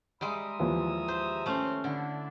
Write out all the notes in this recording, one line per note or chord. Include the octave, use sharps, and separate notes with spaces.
G3 G#3 E5 A#5 D#6
D#2 E3 F3
C5
A3 C4 C#4 C5
D3 D4 E4